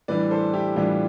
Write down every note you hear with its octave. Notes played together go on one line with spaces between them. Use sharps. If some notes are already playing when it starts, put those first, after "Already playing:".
A2 E3 G3 D4 B4 D5
A4 C5
E4 G4
A2 E3 G3 D4 F4